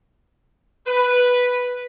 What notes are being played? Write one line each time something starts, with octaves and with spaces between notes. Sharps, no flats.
B4